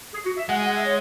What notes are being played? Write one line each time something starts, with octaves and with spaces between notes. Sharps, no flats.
G#4
F#4
E5
G#3 F#5
G#5
F#5
E5
C#5